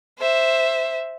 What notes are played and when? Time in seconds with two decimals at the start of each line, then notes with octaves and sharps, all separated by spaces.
0.19 C5 E5